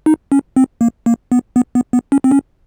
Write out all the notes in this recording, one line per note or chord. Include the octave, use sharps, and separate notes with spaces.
D#4
C#4
C4
A#3
A#3
B3
B3
B3
B3
C#4
C4
C#4